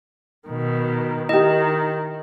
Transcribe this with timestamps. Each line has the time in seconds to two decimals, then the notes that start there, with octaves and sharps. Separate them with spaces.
0.48 B2 D#3
1.29 D#3 E4 G4 D#5